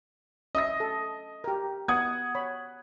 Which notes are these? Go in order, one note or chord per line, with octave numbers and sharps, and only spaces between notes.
C#4 D#5 E5 D#6 A#6
A4
G4 A#4
B3 F#5 D#6 G#6
C#5 B5